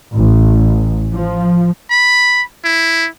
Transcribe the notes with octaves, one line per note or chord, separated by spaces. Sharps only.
A1
F3
B5
E4